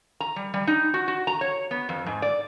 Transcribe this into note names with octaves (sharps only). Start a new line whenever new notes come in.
A#5
G3
G3
D#4
F#4
F#4
A#5
C#5
B3
F2
G#2
D5